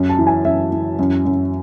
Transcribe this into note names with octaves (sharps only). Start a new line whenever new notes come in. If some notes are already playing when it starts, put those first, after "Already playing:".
Already playing: F#2
A5
E3
G#5
F#2 E5
E3
F#2
F#2